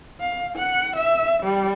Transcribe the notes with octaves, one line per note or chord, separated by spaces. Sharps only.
F5
F#5
E5
G3